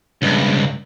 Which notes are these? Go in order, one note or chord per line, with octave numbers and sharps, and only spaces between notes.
C#2 G2